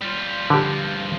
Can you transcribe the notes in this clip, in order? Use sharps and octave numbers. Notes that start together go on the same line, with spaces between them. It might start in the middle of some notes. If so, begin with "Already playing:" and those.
G3 F4
G2 D3 F3 G4